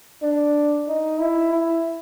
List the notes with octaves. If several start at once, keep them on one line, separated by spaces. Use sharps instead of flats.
D4
D#4
E4
E4